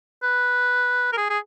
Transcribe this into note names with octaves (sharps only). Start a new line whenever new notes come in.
B4
A#4
G#4
G#4